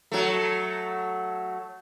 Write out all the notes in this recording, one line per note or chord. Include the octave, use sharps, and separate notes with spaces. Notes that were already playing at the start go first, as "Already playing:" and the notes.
F#3 A3